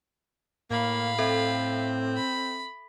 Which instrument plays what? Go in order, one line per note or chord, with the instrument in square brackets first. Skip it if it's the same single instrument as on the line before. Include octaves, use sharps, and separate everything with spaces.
[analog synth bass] A2 [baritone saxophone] A#3 [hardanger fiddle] F5 B5
[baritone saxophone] C4 [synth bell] A4 E5
[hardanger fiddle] B5